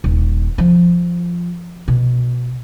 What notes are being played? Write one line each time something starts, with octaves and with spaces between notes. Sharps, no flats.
D#1
F3
B2